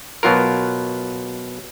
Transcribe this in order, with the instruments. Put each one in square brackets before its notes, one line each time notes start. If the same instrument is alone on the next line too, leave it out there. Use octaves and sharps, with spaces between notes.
[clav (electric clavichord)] B2 F#3 F4 A#4